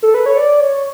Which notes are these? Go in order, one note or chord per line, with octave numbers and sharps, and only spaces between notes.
A4
B4
C#5
D5
C#5